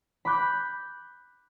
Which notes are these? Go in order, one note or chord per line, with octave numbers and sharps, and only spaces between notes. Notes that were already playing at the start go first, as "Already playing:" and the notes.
B5 D6 F#6 G6